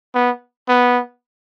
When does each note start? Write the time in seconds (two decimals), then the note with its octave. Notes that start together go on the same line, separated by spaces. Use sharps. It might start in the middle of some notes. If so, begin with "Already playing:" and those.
0.15 B3
0.68 B3